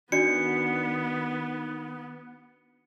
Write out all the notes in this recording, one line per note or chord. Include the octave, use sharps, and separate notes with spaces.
D#3 B3 D4 F#4 D5 C#7